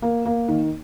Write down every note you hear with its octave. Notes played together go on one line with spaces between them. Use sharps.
A#3
A#3
D#3